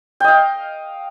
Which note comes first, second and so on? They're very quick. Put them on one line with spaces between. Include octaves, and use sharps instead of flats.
G5 D#5 F5